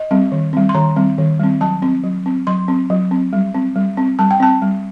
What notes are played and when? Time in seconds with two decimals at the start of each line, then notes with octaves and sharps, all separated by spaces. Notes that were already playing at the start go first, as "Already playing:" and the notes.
Already playing: D#5
0.11 G3 C4
0.32 D#3
0.53 G3 C4
0.69 C6
0.74 D#3 A#5
0.96 G3 C4
1.18 D#3
1.39 G3 C4
1.61 F#3 A5
1.82 C4
2.04 F#3
2.26 C4
2.47 F#3 C6
2.68 C4
2.90 F#3
3.11 C4
3.33 G3
3.54 C4
3.76 G3
3.97 C4
4.19 G3 A5
4.31 G5
4.40 C4 A5
4.62 G3